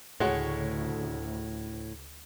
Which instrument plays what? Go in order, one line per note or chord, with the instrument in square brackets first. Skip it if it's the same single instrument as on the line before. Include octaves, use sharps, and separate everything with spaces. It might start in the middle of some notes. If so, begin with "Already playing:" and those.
[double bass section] D2 C#3 [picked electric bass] A2 [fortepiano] G#3 F#4 C#5